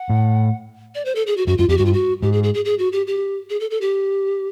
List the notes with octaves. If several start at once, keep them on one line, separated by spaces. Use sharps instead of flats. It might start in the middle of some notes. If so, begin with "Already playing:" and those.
Already playing: F#5
A2
D5
C5
A4
G#4
F#4
F#2 F#4
F#2 F4
F2 G4
G2 F#4
F4
F#4
G#2 G4
G#4
G#4
G#4
G#4
F#4
G4
G4
G#4
A4
A4
G4